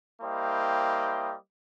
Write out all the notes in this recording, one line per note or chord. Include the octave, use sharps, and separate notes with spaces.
G3 A#3 E4 C5 D#5 G5